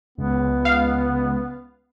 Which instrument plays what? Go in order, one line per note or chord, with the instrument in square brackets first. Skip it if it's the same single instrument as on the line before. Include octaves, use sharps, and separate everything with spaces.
[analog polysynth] C#2 [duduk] B3
[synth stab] F5